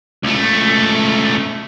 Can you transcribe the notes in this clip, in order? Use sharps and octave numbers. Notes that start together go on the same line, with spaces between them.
C#2 A3